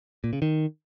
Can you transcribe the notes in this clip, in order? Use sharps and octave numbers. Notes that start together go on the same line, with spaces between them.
A#2
C#3
D#3